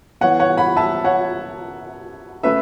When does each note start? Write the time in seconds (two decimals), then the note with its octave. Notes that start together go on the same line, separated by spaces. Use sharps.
0.21 E3 B3 C#5 F#5
0.39 C#5 F#5
0.57 F#5 B5
0.76 E5 A5
1.04 C#5 F#5
2.43 A3 C#4 B4 E5